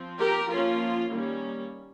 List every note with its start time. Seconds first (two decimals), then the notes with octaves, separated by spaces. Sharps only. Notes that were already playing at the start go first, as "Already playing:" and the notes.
Already playing: F3 C4
0.19 G4 A#4
0.50 F3 A#3 C#4 F4
1.12 D#3 G3 A#3 C#4